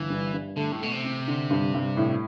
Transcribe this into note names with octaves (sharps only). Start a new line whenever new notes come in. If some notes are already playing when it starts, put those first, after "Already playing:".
Already playing: G1 E3
G2
G2
D3 A3
A2
B2 A3
C3
C4
D3
G2
G2
A2